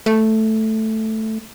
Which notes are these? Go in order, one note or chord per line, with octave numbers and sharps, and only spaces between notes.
A3